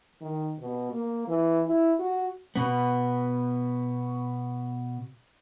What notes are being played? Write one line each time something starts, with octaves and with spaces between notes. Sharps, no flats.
D#3
B2
A#3
E3
E4
F#4
B2 B3